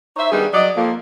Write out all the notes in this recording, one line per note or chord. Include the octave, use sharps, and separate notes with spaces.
D#4 C5 C#5 E5
D#3 G3 B3 D4 D#4 G#4
F#3 D5 D#5
F2 A#3